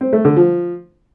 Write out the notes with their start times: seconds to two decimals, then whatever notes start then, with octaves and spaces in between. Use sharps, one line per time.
0.01 C4
0.13 A3
0.25 D3
0.36 F3